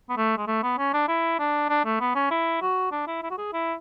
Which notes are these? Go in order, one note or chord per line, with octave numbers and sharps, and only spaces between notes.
B3
A3
G#3
A3
B3
C#4
D4
E4
D4
D4
A3
B3
C#4
E4
F#4
D4
E4
E4
F#4
G#4
E4